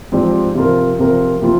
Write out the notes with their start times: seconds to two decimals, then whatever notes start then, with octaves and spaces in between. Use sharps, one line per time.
0.12 G#2 F3 C4 G4 D5
0.55 C3 F3 C4 F4 A#4
0.99 C3 F3 C4 F4 A#4
1.41 C3 F3 C4 F4